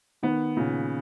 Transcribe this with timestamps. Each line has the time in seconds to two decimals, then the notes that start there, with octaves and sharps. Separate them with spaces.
0.23 D#3 B3
0.57 A#2 C#3